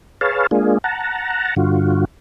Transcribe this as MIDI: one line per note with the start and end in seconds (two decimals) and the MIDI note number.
0.21 0.47 68
0.21 0.47 71
0.21 0.47 73
0.21 0.47 77
0.21 0.47 81
0.51 0.78 56
0.51 0.78 58
0.51 0.78 62
0.51 0.78 65
0.51 0.78 68
0.84 1.55 78
0.84 1.55 81
0.84 1.55 82
1.56 2.05 43
1.56 2.05 50
1.56 2.05 65
1.56 2.05 66